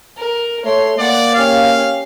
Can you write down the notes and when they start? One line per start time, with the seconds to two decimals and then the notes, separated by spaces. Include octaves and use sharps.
0.17 A#4
0.65 A3 C#5 C6
0.99 A#3 D5 F#5
1.34 C#4 G4 F5